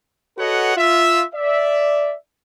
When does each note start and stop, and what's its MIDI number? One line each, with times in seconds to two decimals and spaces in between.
0.38 0.75 66
0.38 0.75 69
0.38 0.75 71
0.38 0.75 73
0.38 0.75 75
0.38 0.75 78
0.77 1.23 65
0.77 1.23 76
1.34 2.15 74
1.34 2.15 76